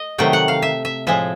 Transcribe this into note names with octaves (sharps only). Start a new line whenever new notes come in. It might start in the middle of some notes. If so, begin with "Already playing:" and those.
Already playing: D#5
C3 D#3 F#3 A3 G5
F#5
F5
E5
E5
A2 F3 G#3 E5